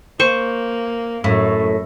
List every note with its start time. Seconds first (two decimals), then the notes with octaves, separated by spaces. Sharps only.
0.20 A#3 C5 C#6
1.24 F#2 A2